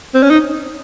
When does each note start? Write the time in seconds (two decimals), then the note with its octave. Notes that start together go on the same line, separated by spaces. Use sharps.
0.14 C4
0.23 C#4
0.30 D#4